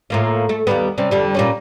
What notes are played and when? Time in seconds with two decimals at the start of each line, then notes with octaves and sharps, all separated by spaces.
0.10 A2 A#3 F4
0.49 A3
0.67 D#2 G3 B3
0.98 C3 G3 C#4
1.11 F2 D3 G3
1.35 A#2 G3 C#4